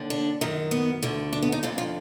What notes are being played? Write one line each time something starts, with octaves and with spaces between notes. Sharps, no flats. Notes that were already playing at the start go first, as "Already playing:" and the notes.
Already playing: D#2 D3
D4
F#2 D#3
B3
D2 D3
D4
B3
D#4
F2 D3 F4
F4